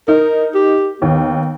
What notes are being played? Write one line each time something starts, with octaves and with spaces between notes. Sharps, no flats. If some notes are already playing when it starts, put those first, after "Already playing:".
D#4 A#4
G4
D#2 B3